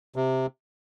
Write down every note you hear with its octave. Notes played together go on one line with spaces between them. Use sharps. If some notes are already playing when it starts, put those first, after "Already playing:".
C3